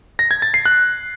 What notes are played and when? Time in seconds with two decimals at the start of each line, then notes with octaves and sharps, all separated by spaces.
0.19 A#6
0.31 G#6
0.42 A6
0.54 C7
0.66 F#6